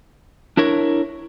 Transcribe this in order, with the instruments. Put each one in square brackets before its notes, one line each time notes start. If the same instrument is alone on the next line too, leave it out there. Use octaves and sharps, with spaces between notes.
[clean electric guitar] D4 E4 A#4 C#5